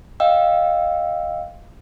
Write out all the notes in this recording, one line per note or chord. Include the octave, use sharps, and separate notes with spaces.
D#5 F5 G5 E6